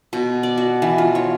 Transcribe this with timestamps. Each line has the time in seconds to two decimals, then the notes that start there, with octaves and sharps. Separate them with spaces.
0.13 B2
0.43 D5
0.58 F#4
0.82 E3
0.98 F4
1.15 C#5